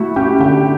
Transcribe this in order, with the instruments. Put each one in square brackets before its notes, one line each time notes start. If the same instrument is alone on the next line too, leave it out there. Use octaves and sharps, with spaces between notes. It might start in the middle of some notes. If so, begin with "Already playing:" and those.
Already playing: [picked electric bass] A3 [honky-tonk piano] E4 F#4
[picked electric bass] C#4 [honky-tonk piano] G4
[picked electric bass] D3 [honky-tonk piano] G4